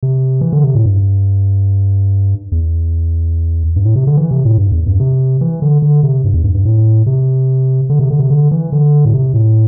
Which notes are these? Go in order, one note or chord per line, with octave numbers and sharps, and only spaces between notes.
C3
E3
D3
C3
A2
G2
E2
G2
A2
C3
D3
E3
C3
A2
G2
E2
G2
C3
E3
D3
D3
C3
G2
E2
G2
G2
A2
C3
D3
C3
D3
C3
D3
E3
D3
A2
C3
A2